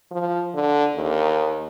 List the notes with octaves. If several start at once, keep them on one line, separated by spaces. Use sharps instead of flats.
F3
D3
D#2